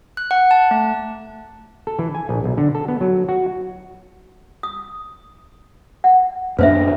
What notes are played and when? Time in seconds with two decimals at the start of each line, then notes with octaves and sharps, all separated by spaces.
0.17 F#6
0.31 F#5
0.51 A5
0.71 A3
1.87 A4
1.99 E3
2.15 G#5
2.29 A#1
2.44 B1
2.57 D3
2.75 A4
2.88 B3
3.01 F#3
3.29 F#4
4.63 D#6
6.04 F#5
6.59 F#2 A#3 D4 B4 C5 E5